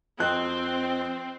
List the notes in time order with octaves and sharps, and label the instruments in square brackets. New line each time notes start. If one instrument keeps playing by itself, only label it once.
[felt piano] F2 D#5 F#6 [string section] C4